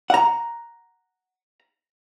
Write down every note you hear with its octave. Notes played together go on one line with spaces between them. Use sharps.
F#5 A#5